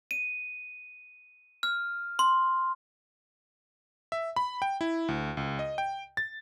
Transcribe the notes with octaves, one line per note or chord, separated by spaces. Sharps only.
D#7
F6
C6
E5
B5
G5
E4
D2
C#2
D#5
G5
A6